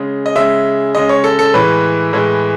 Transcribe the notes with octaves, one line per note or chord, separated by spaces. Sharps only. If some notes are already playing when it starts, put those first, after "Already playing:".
Already playing: C#3 G#3
D#5
C#3 G#3 E5
C#3 G#3 D#5
C#5
A4
A4
A2 E3 G#3 B4
A2 E3 G#3